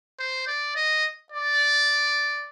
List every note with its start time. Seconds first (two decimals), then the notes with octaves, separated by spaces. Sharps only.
0.19 C5
0.48 D5
0.76 D#5
1.32 D5